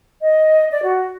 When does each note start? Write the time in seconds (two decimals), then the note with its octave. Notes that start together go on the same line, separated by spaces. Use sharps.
0.21 D#5
0.71 D5
0.83 F#4